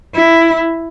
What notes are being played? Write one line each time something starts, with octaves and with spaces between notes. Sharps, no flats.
E4